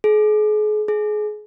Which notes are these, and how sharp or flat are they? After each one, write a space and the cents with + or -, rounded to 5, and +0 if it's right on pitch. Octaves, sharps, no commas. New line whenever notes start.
G#4 +40
G#4 +25